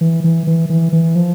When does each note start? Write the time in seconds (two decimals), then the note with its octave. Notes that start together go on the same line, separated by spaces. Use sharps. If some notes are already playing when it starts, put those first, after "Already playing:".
0.01 E3
0.24 E3
0.47 E3
0.70 E3
0.93 E3
1.15 F3